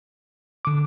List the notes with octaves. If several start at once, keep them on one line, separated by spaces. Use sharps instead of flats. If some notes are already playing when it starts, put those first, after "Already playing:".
D3 D6